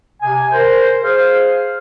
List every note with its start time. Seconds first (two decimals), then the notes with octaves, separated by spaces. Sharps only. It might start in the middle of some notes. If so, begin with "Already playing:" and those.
0.21 C3 G#5
0.52 A#4 C5
1.03 G#4 C5 F5